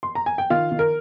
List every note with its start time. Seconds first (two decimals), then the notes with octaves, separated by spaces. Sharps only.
0.03 C6
0.15 A#5
0.26 G#5
0.38 G5
0.50 D#3 F4 F5
0.72 D#3
0.79 A#4